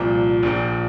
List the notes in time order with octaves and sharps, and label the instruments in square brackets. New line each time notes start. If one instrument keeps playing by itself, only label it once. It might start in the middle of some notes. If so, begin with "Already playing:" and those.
Already playing: [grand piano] C2 A#2 F3
A#1 A#2 F3